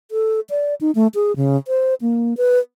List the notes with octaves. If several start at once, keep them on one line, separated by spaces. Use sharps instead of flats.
A4
D5
D#4
A3
G#4
C#3
C5
A#3
B4